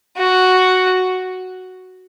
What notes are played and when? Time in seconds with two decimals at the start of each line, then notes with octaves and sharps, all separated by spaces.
0.18 F#4